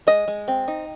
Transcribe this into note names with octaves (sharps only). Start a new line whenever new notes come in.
G#3 D#5
G#3
C4
D#4